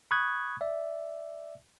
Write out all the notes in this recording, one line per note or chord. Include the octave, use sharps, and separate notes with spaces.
B5 C#6 D#6 F#6 G#6
D5 E5